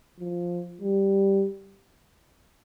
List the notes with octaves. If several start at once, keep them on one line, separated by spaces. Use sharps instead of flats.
F3
G3